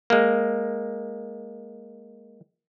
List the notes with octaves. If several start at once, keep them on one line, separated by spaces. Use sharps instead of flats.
G#3 A#3